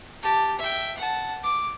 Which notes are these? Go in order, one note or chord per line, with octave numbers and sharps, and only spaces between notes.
G4 A5
E5 G5
F#5 A5
D6